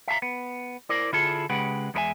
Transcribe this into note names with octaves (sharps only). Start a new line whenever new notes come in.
E5 F5 A5 A#5
B3
E4 A#4 C5 D5
D3 E4 F4 G#4 A4
C#2 C#3 G#3 G4 B4 F#5
E2 G#3 E4 A#4 E5 G#5